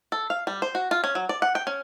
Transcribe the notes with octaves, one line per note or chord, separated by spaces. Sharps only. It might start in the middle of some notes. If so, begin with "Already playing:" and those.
A4
F5
G3
C5
F#4
F4
C#4
F#3
D5
F#5
G5
C#4